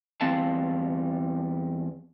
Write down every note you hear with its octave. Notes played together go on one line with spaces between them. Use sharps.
E2 G3 C4 F5 A5